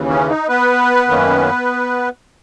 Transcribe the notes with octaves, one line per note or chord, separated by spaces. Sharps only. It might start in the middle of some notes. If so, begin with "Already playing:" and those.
Already playing: D#2 C#3 E3
C#4
D#4
B3 B4
F#2 D#3 A#3 C#4